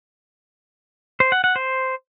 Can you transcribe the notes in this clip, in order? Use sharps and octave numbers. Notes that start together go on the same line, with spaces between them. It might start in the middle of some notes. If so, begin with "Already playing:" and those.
C5
F#5
F#5
C5